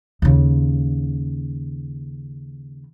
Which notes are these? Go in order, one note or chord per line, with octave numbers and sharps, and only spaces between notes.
D#2 C#3